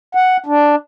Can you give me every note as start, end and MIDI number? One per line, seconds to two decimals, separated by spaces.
0.15 0.37 78
0.46 0.76 62